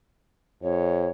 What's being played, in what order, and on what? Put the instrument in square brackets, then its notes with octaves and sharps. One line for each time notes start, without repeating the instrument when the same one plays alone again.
[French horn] F2 [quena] C#5